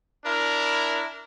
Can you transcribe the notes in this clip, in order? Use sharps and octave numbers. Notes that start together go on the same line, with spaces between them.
D4 E4 A#4